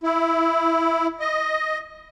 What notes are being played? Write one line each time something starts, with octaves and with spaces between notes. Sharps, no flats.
E4
D#5